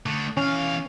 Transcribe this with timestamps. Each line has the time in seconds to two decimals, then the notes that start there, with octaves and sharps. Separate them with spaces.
0.06 D3 A3
0.37 E2 C#4 F5